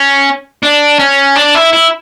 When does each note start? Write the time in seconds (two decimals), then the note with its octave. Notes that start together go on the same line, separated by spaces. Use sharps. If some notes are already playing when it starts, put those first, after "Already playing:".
Already playing: C#4
0.63 D4
0.99 C#4
1.36 D4
1.55 E4
1.73 E4